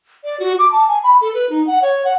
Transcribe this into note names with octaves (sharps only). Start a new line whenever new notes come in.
D5
F#4
D6
A5
G#5
B5
A4
B4
D#4
F#5
C#5
F#5